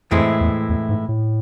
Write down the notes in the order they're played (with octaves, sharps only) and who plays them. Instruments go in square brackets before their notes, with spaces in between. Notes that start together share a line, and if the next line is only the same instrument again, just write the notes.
[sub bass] F2 [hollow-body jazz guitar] A2 E3 G#3 C4 E4
[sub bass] E2
E2
G#2
A2